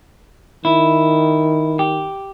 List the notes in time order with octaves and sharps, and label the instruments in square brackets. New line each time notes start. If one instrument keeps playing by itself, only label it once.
[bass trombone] D#3 [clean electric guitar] E4
[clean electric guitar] G4